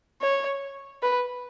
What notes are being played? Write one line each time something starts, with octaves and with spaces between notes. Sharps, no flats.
C#5
B4